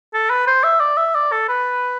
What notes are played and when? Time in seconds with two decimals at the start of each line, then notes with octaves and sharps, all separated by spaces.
0.14 A4
0.30 B4
0.47 C5
0.64 E5
0.80 D5
0.97 E5
1.15 D5
1.32 A4
1.49 B4